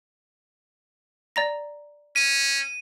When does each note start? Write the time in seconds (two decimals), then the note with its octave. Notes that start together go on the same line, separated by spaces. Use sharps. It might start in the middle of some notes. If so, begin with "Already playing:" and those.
1.36 D5 A#5 A#6
2.16 C#4 D#7